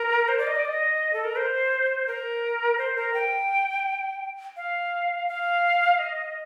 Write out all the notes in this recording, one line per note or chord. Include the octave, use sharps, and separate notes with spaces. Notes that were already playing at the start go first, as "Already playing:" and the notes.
Already playing: A#4
C5
D5
D#5
D5
D#5
A4
A#4
C5
A#4
C5
A#4
G5
F5
F5
D#5